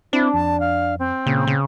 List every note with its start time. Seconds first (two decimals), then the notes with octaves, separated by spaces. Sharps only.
0.13 C4 D4 E4
0.34 F2 A5
0.60 F5
0.99 C4
1.26 A#2 C#3
1.47 C#3